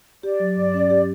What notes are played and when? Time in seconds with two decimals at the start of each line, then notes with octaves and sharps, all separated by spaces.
0.23 G4 D5
0.40 F#3
0.56 G2
0.74 C#4
0.90 G4